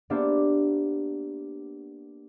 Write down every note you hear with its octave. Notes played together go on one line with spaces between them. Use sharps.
A#3 B3 D4 G4 C5 E5